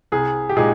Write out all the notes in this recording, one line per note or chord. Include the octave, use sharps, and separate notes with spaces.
C2 G#4
G4
A#2 G#3 D#4 G#4